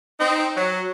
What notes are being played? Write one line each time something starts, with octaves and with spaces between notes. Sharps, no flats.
C4 D#4
F#3